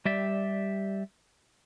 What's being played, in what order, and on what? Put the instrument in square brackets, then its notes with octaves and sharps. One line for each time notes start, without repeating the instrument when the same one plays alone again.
[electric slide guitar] G3 G4 D5 E5